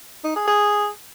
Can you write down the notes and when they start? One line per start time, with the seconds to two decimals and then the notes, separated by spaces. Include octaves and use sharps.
0.24 D#4
0.36 G#4
0.47 G#4